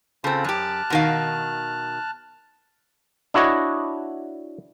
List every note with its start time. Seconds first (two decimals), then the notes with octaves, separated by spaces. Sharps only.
0.24 C#3 C4 F4 A4
0.44 F#2 G4 A5 F6 F#6
0.90 B2 D#3 F5
3.34 D4 E4 F#4 C#5 D#5